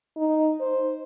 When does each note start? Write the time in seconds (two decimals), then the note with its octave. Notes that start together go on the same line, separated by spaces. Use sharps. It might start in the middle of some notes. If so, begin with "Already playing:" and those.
0.17 D#4
0.60 C5